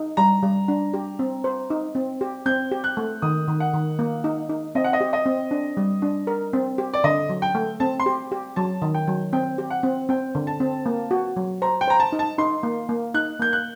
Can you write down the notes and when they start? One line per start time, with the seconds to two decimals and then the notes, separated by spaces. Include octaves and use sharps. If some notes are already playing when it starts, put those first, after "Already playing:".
Already playing: D#4
0.17 G3 A#5
0.43 G3
0.68 D4
0.94 G4
1.19 C4
1.44 C5
1.70 D#4
1.95 C4
2.21 G4
2.46 C4 G6
2.72 G4
2.84 F#6
2.97 A3
3.22 D#3 D#6
3.48 D#3
3.60 F#5
3.74 D#3
3.99 A#3
4.24 D#4
4.49 D#4
4.75 C4 D#5
4.84 F#5
4.93 D#5
5.01 G4
5.13 D#5
5.26 C4
5.51 D4
5.77 G3
6.02 D4
6.27 A#4
6.53 C4
6.78 G4
6.94 D5
7.04 D3 D#5
7.29 F#3
7.42 G5
7.55 A3
7.80 C4 A5
8.00 C6
8.06 G4
8.32 G4
8.56 F#3 A5
8.82 D#3
8.94 G5
9.07 F#3
9.33 C4 G5
9.58 G4
9.70 F#5
9.83 C4
10.09 C4 G5
10.35 D3
10.47 A5
10.60 C4
10.86 A#3
11.11 F#4
11.36 F#3
11.62 C5 A#5
11.81 G5
11.88 C5 A#5
12.00 A5
12.12 D#4
12.19 A5
12.38 D#4 C6
12.63 A#3
12.89 A#3
13.14 D#4 F#6
13.40 A#3 G6
13.53 F#6